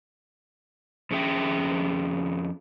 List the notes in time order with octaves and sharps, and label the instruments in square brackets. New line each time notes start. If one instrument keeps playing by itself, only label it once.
[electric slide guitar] F2 C#4 G#4 E5 G5